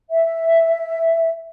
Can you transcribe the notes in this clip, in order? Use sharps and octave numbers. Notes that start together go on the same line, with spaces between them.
E5